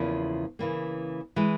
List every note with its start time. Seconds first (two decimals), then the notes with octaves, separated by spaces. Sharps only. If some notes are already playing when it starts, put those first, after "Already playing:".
Already playing: E2 C#3 F3 A#3 E4
0.59 C#3 E3 A#3
1.36 E3 G#3